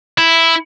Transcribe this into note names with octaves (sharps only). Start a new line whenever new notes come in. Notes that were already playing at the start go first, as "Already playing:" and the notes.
E4